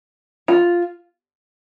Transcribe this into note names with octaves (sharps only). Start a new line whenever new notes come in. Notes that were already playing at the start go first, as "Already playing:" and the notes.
F4